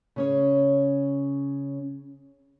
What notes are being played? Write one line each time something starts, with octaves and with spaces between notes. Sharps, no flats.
C#3 C#4 C#5